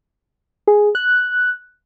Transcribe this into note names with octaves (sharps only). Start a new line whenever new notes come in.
G#4
F#6